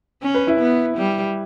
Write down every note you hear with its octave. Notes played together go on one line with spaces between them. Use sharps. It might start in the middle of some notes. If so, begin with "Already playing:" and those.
C#4
B4
E4
B3
G3